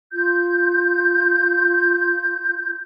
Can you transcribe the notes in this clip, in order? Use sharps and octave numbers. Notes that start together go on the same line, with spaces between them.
F4 G6